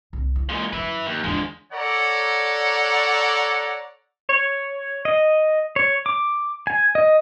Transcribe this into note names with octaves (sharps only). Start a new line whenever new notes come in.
C2
E3
A#2 G#3
F#2 B4 E5
D#2
E2 F3 G#3 D4
A4 C#5 D5 F#5 A#5
C#5
D#5
C#5
D6
G#5
D#5